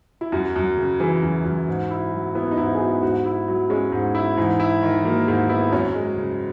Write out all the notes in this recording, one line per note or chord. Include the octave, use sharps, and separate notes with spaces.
E4
F#2 F#4
F#2
C#3
E3 G#4
F#2
F#2
G#2
E4
F#3
B3 E4
D#4
G#2 E4
G#4
E4 F#4
G#2 F#4
E4
F#3
G#3 C#4
G#2
E4
G#2 E3
E4
D#3
E3
F#3 A#3
G#2 G#3
B3 E4
F#2 C#4
G#3
C#3